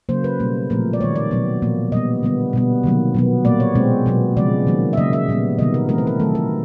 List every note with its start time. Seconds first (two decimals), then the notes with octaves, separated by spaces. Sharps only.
0.09 C#3 F#3 A#3 C5
0.24 B4
0.40 B2 G3 A#3
0.70 A#2 F3 A3 C4 A#4
0.93 D5
1.01 D#3 G3 A#3 C#5
1.16 D5
1.31 B2 F#3 B3
1.62 A#2 F3 A#3
1.92 B2 G3 B3 D#5
2.23 D3 G3 B3
2.53 B2 G3 B3
2.84 C3 D#3 F#3 A#3
3.14 B2 F#3 B3
3.45 A#2 G3 A#3 D5
3.60 C#5
3.75 B2 G#3 C4
4.06 B2 F#3 B3
4.37 C#3 F3 G#3 D5
4.67 D#3 F#3 A#3
4.93 E5
4.97 C#3 F#3 A#3 D#5
5.13 E5
5.28 A#2 G3 B3
5.59 C3 D#3 G3 B3 D#5
5.74 A#4
5.89 E3 A3 C4 A#4
5.98 B4
6.07 A#4
6.20 D#3 F#3 A3 A4
6.35 A#4